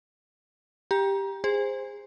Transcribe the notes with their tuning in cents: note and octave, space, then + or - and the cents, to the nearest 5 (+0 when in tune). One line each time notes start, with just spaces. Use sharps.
G4 +5 A#5 +25
G#4 -25 C5 +0